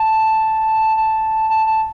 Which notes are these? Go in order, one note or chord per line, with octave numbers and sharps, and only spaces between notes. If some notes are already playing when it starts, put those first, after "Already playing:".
Already playing: A5
A5
A5
A5